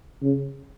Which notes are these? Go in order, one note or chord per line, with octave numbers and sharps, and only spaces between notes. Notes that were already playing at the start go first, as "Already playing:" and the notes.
C#3